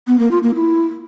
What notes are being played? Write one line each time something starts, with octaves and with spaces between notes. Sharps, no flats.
B3
A#3
F4
A#3
E4